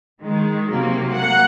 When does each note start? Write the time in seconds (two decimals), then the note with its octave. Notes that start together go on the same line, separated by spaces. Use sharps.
0.23 D#3 G#3
0.70 C3 F#3 A#3
1.16 F#3 A#3 F#5